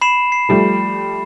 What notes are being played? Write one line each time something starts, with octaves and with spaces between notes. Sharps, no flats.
B5 C7 E7
C7
F3 G3 A3